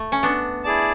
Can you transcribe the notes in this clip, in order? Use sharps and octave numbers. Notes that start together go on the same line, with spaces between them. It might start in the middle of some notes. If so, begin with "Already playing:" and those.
Already playing: A3
C#4
B3 D4
E4 G#4 D5 A5